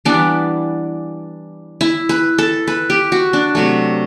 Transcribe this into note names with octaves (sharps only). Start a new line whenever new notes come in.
E3 G3 B3 D4
E4
B4
A4
B4
G4
F#4
D4
C3 F#3 A3